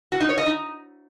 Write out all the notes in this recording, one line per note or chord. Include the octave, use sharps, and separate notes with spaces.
F#4
D#4
C#5
D#5
D#4